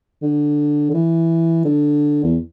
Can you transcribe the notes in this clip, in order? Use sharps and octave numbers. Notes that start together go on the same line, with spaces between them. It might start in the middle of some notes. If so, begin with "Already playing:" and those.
D3
D3
E3
D3
E2